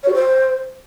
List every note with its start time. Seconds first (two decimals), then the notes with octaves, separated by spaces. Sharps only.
0.03 C#5
0.08 F#4
0.13 C5